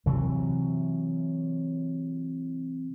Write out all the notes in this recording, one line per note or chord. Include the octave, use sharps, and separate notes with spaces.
C3 E3 F#3